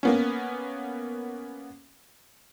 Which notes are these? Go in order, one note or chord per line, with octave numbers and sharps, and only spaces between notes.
A#3 B3 C#4